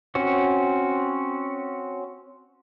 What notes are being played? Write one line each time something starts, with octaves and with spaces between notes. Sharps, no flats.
C4 C#4 F#4